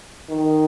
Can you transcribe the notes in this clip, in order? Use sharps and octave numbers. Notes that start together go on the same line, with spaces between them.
D#3